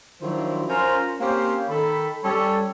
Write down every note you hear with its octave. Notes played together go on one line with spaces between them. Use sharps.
D#3 F3 F#3 D4 E4 C5
C#4 F4 A#4 C5
A#3 C4 C#4 G4 C5 F5
D#3 A4 B5
G3 C#4 A4 C#5 A5